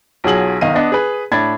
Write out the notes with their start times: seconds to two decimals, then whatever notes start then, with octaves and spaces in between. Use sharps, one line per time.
0.24 B1 F#3 F4 G#4 F#7
0.61 G1 D#3 D#5 F5 D#7
0.75 B3 D4 D#5
0.92 G#4 B4
1.32 A2 D4 B5 G#6 A6